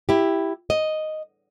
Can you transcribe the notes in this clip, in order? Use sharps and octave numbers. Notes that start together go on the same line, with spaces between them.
E4 G4
D#5